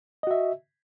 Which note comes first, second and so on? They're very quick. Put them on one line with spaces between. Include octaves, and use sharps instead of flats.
D#5 F#4 E5